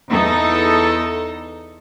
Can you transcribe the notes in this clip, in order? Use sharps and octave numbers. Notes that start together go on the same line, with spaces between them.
E2 D#4 A4